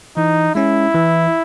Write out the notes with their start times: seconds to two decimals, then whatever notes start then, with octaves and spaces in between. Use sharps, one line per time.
0.17 E3 D#4
0.55 G#3 C#4 E4
0.95 E3